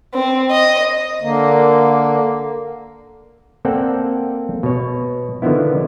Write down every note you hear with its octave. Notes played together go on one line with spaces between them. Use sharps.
C4
D#5
D3 A#3
A#3 C4 A4 D5 F#5 G5
B2 C#5
D3 D#3 F3 B3 E4